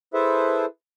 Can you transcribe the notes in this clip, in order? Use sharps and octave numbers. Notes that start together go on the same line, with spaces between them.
E4 G#4 A4 B4 C5 E5